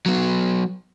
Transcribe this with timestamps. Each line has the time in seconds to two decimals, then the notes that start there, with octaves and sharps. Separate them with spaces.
0.06 F#3 B3